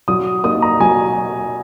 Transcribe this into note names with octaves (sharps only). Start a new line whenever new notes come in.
F#3 D#6
A#3 D#4 D#6
A#5
F#3 G#5